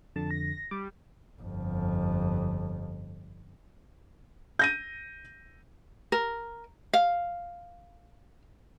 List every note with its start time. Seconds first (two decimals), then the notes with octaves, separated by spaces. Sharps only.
0.16 F2 D3 A5
0.31 A#6
0.71 G3 D6
1.41 G1 F2
4.59 G6 A#6 D#7
6.12 A#4
6.93 F5